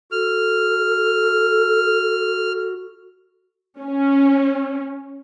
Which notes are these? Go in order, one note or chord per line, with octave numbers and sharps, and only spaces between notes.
F#4 A4 F6
C#4